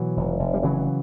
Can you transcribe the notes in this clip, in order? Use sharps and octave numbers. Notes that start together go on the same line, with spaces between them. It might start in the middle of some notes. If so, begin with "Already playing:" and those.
Already playing: B2 E3 F#3
F1
F1
G3
C#3 E3 F#3